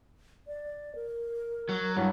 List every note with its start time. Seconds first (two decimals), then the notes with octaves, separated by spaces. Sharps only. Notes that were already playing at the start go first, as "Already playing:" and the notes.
0.47 D5
0.95 A#4
1.69 F#3
1.97 G2 F#3 E4